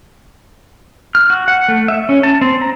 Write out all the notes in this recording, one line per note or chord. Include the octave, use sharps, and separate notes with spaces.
F6
F#4
F#5
A3
E5
C#4
A5
C4
A#5